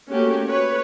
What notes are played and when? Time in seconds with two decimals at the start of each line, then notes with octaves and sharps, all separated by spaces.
0.11 A3 A#3 C#4 F#4 G4
0.48 B4 C#5